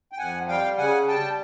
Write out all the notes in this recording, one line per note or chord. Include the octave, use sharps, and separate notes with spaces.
G5
F2 F#5 G#5
G3 F5 G5
C#3 F#5 G#5
G3 G5 A5